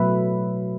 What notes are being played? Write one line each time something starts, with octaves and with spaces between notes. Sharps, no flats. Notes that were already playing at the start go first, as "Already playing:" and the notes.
Already playing: B2 F#3 A3 B4 E5